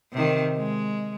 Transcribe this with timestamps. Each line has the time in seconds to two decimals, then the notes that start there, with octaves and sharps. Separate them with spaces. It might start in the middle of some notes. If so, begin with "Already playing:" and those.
0.12 C3 D#3
0.57 G#3